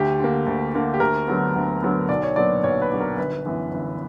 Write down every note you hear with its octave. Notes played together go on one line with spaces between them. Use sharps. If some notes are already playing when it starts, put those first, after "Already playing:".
Already playing: D2 G4
D3 A#3
D2
D3 A#3
G4
D2 A#4
D3 F#3 B3
D2
D3 F#3 B3
B1 D5
C#5
A#2 F#3 B3 D4 D5
B1 C#5
B4
A#2 F#3 B3 D4
A#4
G1 B4
F#2 E3 B3
G1